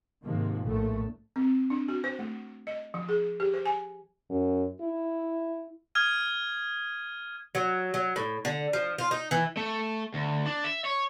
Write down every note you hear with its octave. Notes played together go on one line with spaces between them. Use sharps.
G#2 C3 D#3 F3 A#3
A#1 A2 A3
C4
D4
F#4
C5
A3
D#5
F3
G#4
G4
C5
G#5
F#2
E4
D#6 F6 G#6 D#7
F#3
F#3
A2
D3
F3
F4
D#4
E3
A3
D2
D4
E5
C#5